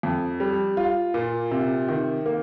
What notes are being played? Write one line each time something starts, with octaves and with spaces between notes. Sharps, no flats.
F2
G3
F4
A#2
C3
D#3
A#3